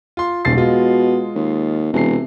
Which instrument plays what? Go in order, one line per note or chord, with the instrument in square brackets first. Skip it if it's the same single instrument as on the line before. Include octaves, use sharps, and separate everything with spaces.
[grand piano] F4 C6
[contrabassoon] D#1 [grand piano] B1 A6 C7
[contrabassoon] B2 [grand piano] G#3 F4
[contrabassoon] D#2
[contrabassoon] E1 [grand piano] C3 C7